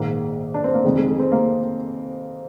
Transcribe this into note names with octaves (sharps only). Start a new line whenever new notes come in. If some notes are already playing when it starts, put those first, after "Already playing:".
Already playing: A#1 G#2 D#3 A#3
D4
C4
A#3
F1 F2 D#3 G#3
G#3
G#3
C4
A#3